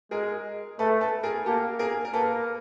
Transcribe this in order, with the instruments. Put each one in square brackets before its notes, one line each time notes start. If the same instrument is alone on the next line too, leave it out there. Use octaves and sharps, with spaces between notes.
[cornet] G#3 [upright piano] G#4 A#4
[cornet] A3 [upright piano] A4 B4
[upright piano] A4 B4
G#4 A#4
[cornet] A#3 [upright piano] G4 A4
[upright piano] G#4 A#4
A#4
[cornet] A#3 [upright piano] A4 B4